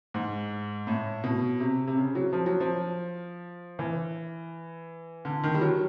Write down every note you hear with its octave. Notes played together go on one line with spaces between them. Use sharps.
G#2
A2
B2
C3
C3
C#3
F#3
F3
F#3
F3
E3
D3
D#3
G3
F#3